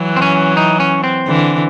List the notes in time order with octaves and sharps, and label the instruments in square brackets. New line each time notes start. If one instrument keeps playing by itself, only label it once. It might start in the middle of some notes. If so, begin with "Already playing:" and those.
Already playing: [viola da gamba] E3 F#3
[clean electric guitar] C4
C#4
D#4
C#4
C4
[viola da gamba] D3 E3